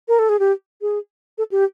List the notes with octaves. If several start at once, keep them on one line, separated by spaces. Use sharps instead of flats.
A#4
A4
G#4
G4
G#4
A4
G4